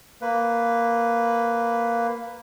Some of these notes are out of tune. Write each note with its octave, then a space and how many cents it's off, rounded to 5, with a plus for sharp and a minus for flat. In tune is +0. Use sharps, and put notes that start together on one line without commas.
A#3 +0 B4 +5